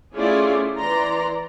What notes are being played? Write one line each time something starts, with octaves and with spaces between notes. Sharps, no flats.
A3 C#4 E4 F4 G#4 D5
E3 D5 A#5 C6